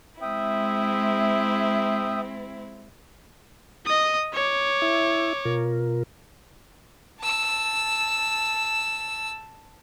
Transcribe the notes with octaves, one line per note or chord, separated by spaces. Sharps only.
G#3 C4 E4 E5 G5 D#6
D#5 D#6
C#5 D6
E4 E5
B2 F4 A#4
A5 E6